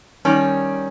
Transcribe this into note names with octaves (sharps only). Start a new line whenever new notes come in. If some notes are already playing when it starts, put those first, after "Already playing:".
D#3 G3 C#4